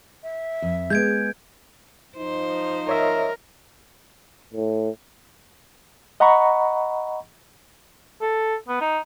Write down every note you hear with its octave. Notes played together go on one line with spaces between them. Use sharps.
E5
F2
G#3 B3 G#4 G6 G#6 D7
F3 D#4 C5
A#4 C#5 D#5 E5
A2
D#5 F#5 A#5 B5 C#6
A4
B3
D#4